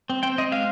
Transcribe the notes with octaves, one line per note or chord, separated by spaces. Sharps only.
C4
C4 G5
C4 D#5
G#3 F5